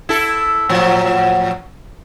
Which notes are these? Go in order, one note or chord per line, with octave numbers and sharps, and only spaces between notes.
E4 A4
A2 F3 F#3